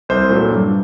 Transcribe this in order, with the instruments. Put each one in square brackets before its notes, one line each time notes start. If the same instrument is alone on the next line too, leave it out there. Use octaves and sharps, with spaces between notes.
[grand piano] C2 C5
A#2 F#3 A3
G2